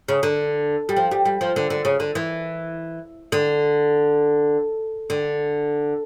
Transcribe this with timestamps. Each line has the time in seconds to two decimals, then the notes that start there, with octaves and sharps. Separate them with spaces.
0.09 C#3
0.23 D3
0.89 G3
0.96 F3
1.11 G3
1.25 G3
1.41 F3
1.56 D3
1.70 D3
1.85 C#3
2.00 D3
2.15 E3
3.32 D3
5.10 D3